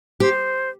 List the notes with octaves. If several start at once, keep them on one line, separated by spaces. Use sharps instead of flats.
G4 C5